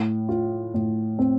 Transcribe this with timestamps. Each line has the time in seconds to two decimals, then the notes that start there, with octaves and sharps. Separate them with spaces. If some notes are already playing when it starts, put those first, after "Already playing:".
Already playing: A2
0.29 F4
0.74 A2
1.19 C4